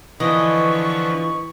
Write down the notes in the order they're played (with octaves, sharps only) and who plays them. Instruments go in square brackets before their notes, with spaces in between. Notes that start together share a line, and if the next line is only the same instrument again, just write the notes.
[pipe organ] D3 F3 B4 [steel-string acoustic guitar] E3 [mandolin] D#5 [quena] C#6